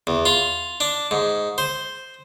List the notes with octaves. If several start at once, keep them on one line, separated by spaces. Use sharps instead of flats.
E2
F4
D4
G#2
C5